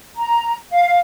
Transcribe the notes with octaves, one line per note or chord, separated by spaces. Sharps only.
A#5
F5